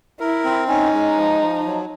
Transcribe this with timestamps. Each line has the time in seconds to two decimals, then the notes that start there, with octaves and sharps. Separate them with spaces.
0.20 E4 A#4
0.44 C4
0.68 C#4 D#4
0.93 G#3
1.17 F3
1.42 F3
1.66 F#3